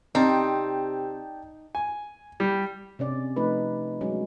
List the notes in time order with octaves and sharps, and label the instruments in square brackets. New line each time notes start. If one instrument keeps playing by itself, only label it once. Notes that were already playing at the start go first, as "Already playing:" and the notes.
[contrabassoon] C3 [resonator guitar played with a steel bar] C4 [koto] D#4 [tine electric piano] D5 G5 A5
[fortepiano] G#5
G3
[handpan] C3 C#4 D5
F3 A3 D#4 B4
F#3 G#3 C#4